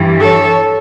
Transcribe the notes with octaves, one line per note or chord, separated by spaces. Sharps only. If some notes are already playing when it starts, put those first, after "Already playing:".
Already playing: G2 E3 G3
A4 C#5